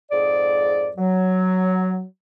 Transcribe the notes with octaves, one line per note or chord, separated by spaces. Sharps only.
F2 G#2 G#4 D5
F#3